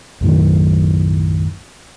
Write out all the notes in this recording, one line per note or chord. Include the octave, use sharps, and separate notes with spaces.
B1 F#2 A2 D#3